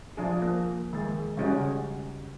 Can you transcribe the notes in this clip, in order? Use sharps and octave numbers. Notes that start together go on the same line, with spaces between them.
F3 D4 G#4
A#3
D#3 G#3
C#3 G3 G#3 C#4 D#4 F#4